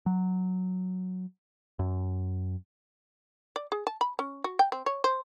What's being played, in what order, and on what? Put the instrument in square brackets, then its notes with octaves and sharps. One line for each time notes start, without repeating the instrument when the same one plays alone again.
[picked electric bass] F#3
F#2
[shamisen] D5
G#4
A5
B5
C#4
F#4
G5
C4
C#5
C5